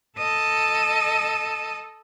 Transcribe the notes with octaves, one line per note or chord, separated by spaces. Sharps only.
A4 D#5